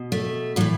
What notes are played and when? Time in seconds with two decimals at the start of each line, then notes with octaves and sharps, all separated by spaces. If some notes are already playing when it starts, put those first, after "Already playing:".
Already playing: B2
0.12 A3
0.56 A2 F#3
0.61 E3